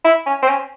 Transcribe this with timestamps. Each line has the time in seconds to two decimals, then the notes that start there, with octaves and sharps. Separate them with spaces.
0.05 E4
0.26 C#4
0.43 C4
0.49 C#4